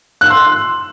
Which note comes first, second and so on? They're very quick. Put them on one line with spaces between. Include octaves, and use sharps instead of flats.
F#6 E6 C6